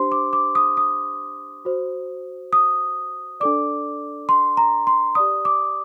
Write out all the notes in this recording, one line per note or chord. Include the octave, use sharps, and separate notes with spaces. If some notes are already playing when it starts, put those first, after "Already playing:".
Already playing: D4 G4 C5 C6
D6
D6
D#6
D#6
F#4 C5
D#6
D4 A4 D5 D6
C6
A#5
C6
G4 D5 D#6
D6